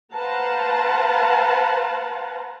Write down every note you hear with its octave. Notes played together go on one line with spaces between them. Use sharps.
B4 C5 F5 F#5 A5 A#5